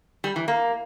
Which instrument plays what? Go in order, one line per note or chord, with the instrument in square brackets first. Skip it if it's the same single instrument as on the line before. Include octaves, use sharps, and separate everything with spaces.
[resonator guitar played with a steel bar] G3
E3
A#3